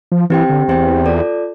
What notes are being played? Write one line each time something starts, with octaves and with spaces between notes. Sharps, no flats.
F3
E3 C4 G4 C5 G5
D3
E2 C4 G4 C5 G5
F4 A4 D5